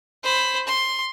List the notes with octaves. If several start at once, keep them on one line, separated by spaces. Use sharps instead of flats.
C5 B5
C6